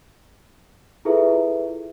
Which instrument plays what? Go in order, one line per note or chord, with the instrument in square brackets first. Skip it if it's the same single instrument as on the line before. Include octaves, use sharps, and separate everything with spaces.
[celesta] E4 F4 G#4 A4 B4 E5